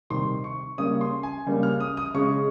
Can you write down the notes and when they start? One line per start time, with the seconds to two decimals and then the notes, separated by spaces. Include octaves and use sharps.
0.10 C3 D#3 G3 C6
0.44 C#6
0.78 C#3 G3 A#3 C#4 D#6
1.01 C6
1.23 G#5
1.46 C#3 G3 A#3 C#4
1.63 F6
1.80 D#6
1.97 D#6
2.14 C#3 G#3 C#4 C#6